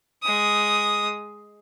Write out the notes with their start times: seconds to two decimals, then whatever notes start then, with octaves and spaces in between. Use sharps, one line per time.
0.23 G#3 D#6